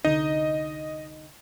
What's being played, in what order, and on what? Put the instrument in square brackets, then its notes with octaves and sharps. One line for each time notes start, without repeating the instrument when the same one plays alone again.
[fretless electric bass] C2 D3 [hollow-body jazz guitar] D#4 [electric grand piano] D#5